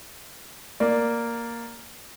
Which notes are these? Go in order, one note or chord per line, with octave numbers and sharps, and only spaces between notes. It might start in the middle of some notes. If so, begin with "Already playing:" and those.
A#3 D5